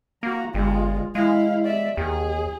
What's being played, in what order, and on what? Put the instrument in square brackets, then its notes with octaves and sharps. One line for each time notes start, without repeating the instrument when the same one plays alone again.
[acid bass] A#3 [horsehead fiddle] F#4 A#5
[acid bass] G1 [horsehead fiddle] G#3 F4
[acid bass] G#3 [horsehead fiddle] E4 F5
[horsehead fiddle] D5 E5
[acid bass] D#2 [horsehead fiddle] G#4